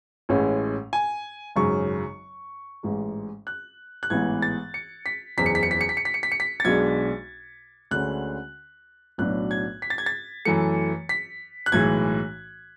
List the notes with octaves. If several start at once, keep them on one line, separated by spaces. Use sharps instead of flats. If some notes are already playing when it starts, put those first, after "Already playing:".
A1 A2 G#3 C#4
G#5
G#1 F#2 C#3 C#6
A1 G#2 G#3
F#6
F#6
A1 G#2 E3 B3 G#6
A6
C#7
B6
F#1 E2 C#3 B6
C#7
B6
C#7
B6
C#7
B6
C#7
B6
C#7
B6
C#7
B6
A6
B1 B2 G#3 D4 G#6
D2 D3 G#3 C#4 F#6
B1 A2 F#3 B3 D4 F#6
G#6
B6
A6
G#6
A6
F#2 E3 A3 C#7
B6
F#6
B1 A2 E3 G#3 G#6